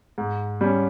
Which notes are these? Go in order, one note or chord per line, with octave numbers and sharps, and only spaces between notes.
G#2
G3 C#4